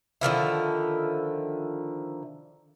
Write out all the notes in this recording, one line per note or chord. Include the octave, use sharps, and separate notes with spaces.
D3 D#3 F3 E4